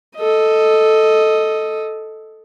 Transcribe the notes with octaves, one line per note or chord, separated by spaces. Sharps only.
A4 D#5